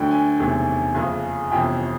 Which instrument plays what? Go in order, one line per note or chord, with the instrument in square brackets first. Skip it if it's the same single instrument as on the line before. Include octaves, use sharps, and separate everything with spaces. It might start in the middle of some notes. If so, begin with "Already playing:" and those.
Already playing: [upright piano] D2 D3 F#3 G5
G#5
E1 D2 C3 D#3
F#1 F2 C#3 G#5
G1 F2 C3 E3 G5